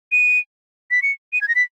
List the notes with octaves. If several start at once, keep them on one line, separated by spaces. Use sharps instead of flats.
D#7
B6
C#7
D#7
G#6
A#6
B6